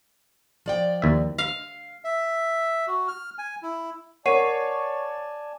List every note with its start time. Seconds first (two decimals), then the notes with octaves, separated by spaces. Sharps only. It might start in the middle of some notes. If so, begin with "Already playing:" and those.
0.66 F3 D5 G5
1.02 D#2 E5
1.38 F5
2.04 E5
2.87 F#4
3.08 F6
3.38 G#5
3.63 E4
4.26 A#4 C#5 D5 F#5 G#5 A5 C7 D#7